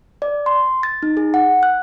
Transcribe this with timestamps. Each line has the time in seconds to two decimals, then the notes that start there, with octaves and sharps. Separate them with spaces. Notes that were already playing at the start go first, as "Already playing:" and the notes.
0.22 D5
0.46 C6
0.83 A6
1.03 D#4
1.17 G#4
1.34 F#5
1.63 F#6